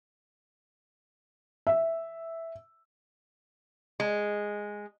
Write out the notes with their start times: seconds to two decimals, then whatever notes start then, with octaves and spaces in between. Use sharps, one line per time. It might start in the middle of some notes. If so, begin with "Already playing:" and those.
1.67 E5
4.00 G#3